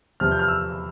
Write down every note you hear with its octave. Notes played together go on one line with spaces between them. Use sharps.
E2 C3 F3 C4 F6
G6
F6
E6